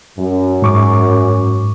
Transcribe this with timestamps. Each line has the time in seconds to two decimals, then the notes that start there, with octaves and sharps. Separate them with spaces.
0.19 F#2
0.62 G#2 C#6 D6